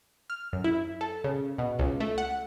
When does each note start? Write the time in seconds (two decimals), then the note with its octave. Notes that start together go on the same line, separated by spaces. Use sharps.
0.30 F6
0.53 F#2
0.64 E4
1.01 A4
1.24 C#3
1.58 B2
1.79 C#2
2.00 A3
2.18 F#5